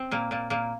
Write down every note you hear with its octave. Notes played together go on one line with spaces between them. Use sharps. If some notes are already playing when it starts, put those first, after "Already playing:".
Already playing: C4
A#2 A#3
A#2 A#3
A#2 A#3